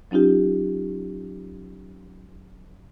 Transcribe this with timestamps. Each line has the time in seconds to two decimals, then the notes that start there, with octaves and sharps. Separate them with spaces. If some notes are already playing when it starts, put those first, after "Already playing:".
0.11 F#3 C#4 D#4 F4 G4